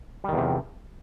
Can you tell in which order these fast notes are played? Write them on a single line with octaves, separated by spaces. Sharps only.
G3 D#3 E2 C3 F3